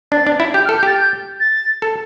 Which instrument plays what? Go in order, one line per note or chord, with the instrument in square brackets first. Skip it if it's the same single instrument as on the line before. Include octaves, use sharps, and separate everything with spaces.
[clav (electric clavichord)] D4 [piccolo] A6
[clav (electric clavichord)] D4
E4
[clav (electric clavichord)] G4 [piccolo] G6
[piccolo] F6
[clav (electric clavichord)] A4
[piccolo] G6
[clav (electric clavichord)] G4 [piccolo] A6
[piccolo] G6
A6
[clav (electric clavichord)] A4